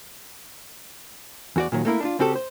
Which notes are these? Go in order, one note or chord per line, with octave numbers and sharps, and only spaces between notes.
E2 F#4 D5
A#2 D#3 F#3
A3 A#3 E4 A#4
D4 D#4 F4
C#3 C4 F#4 G4 A4
C5